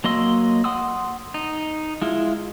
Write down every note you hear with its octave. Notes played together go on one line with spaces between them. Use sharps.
F#3 A#3 D#5 C6 E6
F#5 C6 D#6 E6
D#4
G#3 E4 F4